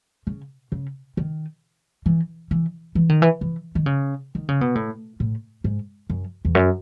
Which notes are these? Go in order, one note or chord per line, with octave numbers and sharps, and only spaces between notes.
C#3
C#3
D#3
E3
E3
E3
D#3
E3
E3
D#3
C#3
D#3
C#3
B2
A2
A2
G#2
F#2
E2
F#2